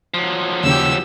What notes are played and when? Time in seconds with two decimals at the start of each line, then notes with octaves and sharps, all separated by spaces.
0.14 F3 F#3
0.64 D#2 C#3 G4 E6